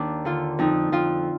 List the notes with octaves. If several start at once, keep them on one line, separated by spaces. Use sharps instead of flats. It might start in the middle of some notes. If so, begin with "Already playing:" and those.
Already playing: D#2 D4
D3 F4
F2 D#4
F2 F4